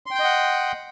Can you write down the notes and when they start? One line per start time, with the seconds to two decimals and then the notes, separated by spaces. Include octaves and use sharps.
0.06 C6
0.11 G5
0.15 G6
0.19 D#5
0.24 F#5